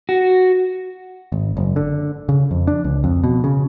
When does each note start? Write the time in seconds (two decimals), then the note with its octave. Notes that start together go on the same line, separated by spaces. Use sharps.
0.09 F#4
1.32 G#1
1.57 F#1
1.76 D3
2.29 C#3
2.51 F2
2.67 D4
2.84 C#2
3.04 F2
3.24 B2
3.44 C#3